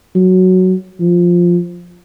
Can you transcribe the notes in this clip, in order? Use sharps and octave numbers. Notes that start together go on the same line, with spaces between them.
F#3
F3